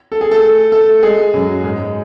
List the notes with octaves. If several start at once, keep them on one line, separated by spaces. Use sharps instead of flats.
A4
G#4
A3 A4
A3 A4
G#3 G#4
F#2 F#3
G#2 G#3
G#3